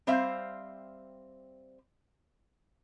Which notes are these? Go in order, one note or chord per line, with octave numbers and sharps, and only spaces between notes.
G3 C4 C5 E5 F5